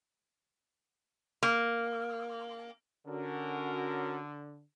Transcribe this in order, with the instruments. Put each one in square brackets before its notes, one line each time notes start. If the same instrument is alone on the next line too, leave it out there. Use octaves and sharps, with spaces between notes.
[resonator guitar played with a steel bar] A#3
[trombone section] D3 [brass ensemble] C#4 F#4 A#4